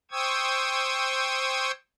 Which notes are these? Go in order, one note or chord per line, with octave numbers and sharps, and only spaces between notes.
C5 G5 C#6 D#6 E6 G#6